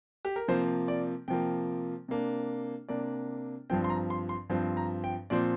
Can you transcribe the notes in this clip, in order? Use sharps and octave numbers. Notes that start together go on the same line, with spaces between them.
G4
A#4
C3 F3 A#3 C5
D5
C3 F3 A#3 G5
C3 A#3 D4
C3 A#3 D4 D5
G2 F3 C4 G5
C6
A#5
C6
C6
G2 F3 C4
A#5
G5
A#2 F3 C4 D5